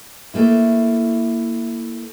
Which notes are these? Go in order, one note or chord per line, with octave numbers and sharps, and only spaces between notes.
A3 A#3 E4